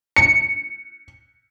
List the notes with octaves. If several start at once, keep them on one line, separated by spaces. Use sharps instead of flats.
C#7